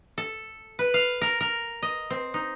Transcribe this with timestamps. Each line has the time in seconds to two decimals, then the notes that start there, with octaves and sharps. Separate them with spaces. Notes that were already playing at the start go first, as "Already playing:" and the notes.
0.18 A4
0.79 B4
0.94 F5
1.21 A#4
1.41 A#4
1.83 D#5
2.10 C4
2.34 D#4